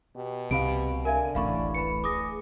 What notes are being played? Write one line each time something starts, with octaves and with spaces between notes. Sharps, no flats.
B2 G4
C2 C3 G4 F5 B5 D7
D3 A#4 E5 F5 G#5
D1 A1 A2 D5 F5 B5 C#6
B4 B5 C#7
G#4 D6 D#6 A#6